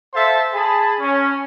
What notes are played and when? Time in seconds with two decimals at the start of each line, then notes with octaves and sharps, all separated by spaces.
0.14 A4 C5 E5 F5 A5 C6
0.54 G#4 A5 B5
0.99 C#4